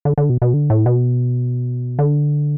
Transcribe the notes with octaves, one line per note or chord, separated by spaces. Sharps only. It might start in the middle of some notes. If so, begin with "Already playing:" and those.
D3
D3
B2
B2
D3
A2
B2
D3